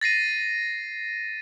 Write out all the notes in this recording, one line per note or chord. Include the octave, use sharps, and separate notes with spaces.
A6 A#6 C7 D#7